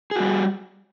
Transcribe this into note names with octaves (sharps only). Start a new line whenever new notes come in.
G3 F#4 G#4